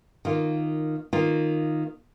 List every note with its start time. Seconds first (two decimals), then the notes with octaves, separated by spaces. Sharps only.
0.25 D#3 A#3 F4
1.13 D#3 A#3 F4